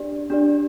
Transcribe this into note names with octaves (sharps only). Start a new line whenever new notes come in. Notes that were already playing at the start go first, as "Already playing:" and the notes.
Already playing: D4 G4 D5
D4 G4 D5